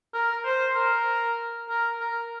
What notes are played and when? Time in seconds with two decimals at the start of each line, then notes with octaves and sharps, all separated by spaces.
0.14 A#4
0.45 C5
0.76 A#4
1.70 A#4
2.00 A#4